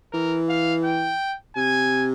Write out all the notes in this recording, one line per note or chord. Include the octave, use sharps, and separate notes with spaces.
E3 A#4
F5
G5
C3 G#5